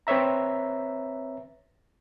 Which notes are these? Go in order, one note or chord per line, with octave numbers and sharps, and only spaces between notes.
C4 B4 C#5 E5 A#5